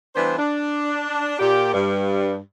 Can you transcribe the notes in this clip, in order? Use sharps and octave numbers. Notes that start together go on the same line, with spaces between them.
E3 G3 B3 D4 C5
D4
A#2 G4
G2